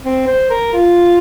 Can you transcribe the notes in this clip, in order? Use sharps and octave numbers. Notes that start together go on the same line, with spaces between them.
C4
C5
A#4
F4